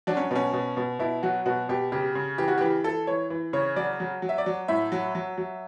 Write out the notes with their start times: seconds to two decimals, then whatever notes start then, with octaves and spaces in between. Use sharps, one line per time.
0.07 F#3 D4
0.17 C#4
0.31 B2 C#4
0.53 B2
0.77 B2
0.99 B2 E4
1.23 F#3 F#4
1.46 B2 F#4
1.69 B2 G4
1.92 C#3 G4
2.15 C#3
2.38 E3 G4
2.48 F#4
2.58 E3 G4
2.84 E3 A4
3.07 E3 C#5
3.30 E3
3.53 C#3 C#5
3.76 F#3 D5
4.00 F#3
4.22 F#3
4.29 E5
4.38 D5
4.46 F#3
4.68 A2 E5
4.92 F#3
5.15 F#3
5.38 F#3